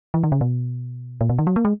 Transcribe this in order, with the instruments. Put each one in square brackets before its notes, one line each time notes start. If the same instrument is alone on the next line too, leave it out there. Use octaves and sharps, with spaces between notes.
[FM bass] E3
D#3
C#3
B2
A#2
B2
D#3
F#3
A#3
G#3